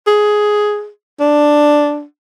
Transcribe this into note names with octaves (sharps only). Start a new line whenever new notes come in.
G#4
D4